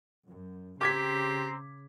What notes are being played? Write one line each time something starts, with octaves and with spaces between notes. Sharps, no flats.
F#2
C#3 C4 G4 A#5 C6 D6 G#6 B6